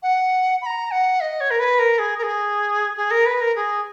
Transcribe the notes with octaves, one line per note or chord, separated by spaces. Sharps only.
F#5
B5
A#5
F#5
D#5
C#5
A#4
B4
A#4
G#4
A#4
G#4
G#4
A#4
B4
A#4
G#4